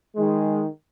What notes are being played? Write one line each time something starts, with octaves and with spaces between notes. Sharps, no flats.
D#3 G#3